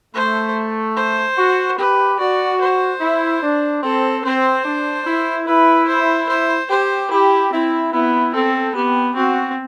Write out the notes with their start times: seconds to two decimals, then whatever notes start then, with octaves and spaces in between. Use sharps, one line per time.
0.14 A3 C5
0.96 C5
1.37 F#4
1.78 G4 B4
2.19 F#4 D5
2.61 C5
3.01 E4
3.43 D4
3.83 C4 A4
4.25 C4 C5
4.65 D4
5.07 E4
5.47 E4 B4
5.88 C5
6.29 C5
6.70 G4 C5
7.11 E4 G4
7.52 C4 E4
7.93 B3 E4
8.34 C4 A4
8.75 B3 G4
9.16 C4 F#4